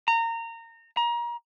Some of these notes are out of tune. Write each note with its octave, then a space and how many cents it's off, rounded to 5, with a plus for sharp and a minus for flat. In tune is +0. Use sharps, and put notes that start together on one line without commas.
A#5 -25
A#5 +30